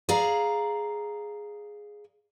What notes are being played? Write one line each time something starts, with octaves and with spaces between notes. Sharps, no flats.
G#4 D5 F5 A#5